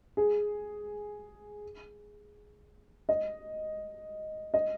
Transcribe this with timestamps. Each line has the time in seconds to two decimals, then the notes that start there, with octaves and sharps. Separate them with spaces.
0.17 G#4
3.09 D#5
4.54 D#5